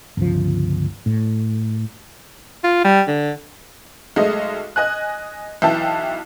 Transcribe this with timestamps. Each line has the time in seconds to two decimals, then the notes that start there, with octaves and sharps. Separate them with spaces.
0.17 G1 C#2 F3
1.06 A2
2.64 F4
2.84 G3
3.07 D3
4.16 B1 G#3 A3 D#5
4.76 D#5 G#5 F#6
5.62 B1 E3 E5 G5 A5